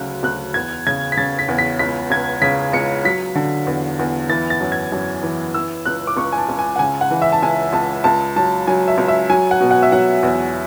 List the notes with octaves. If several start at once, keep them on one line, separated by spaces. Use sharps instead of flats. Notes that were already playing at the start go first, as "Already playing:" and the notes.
Already playing: D2 C#3 F#3 F#6
D2 F#6
E2 G#6
C#3 G#6
B6
C#3 A6
B6
E2
B6
C#2 B6
C#2 G#6
C#3 B6
C#2 C#7
F#3 B6
D3
E2
E2
E3 A6
A6
F#2
G#6
F#2
E3
E3 E6
C#2 F#6
D6
C#2 C#6
G#5
A5
C#2
G#5
F#5
C#3 G#5
F#5
E3
E5
A5
C#2 G#5
C#2 A5
C#2 A5
F#3 A5
F#3 G#5
E5
C#2
E5
F#3 G#5
F#5
B2
F#5
E5
F#3 F#5
E2